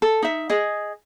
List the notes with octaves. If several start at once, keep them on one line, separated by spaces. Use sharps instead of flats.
A4
D#4 E5
G#4 D#5